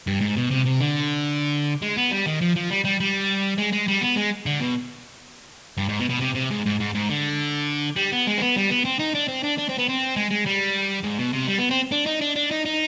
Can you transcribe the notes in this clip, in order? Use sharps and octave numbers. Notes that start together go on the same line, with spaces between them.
G2
G#2
B2
C3
C3
D3
G#3
B3
G3
D#3
F3
F3
G3
G3
G3
G#3
G#3
G3
B3
G#3
D3
B2
G2
G#2
B2
B2
C3
C3
G#2
G#2
G#2
G#2
D3
G3
B3
G#3
C4
B3
G3
B3
C4
D#4
D4
C4
D4
D4
C4
B3
C4
G#3
G#3
G3
G#2
B2
C3
G3
B3
C4
D4
D#4
D4
D4
D#4
D#4